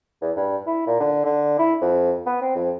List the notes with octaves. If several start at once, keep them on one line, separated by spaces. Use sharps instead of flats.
E2
G2
E4
A#2
D3
D3
E4
F2
B3
C4
F2